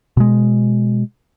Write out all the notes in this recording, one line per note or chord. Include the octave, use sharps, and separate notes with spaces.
B2 G#3